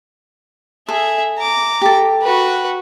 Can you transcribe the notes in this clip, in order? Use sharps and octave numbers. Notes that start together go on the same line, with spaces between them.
G#4 A4 E5
A#5 D6
G4 A4
F#4 B4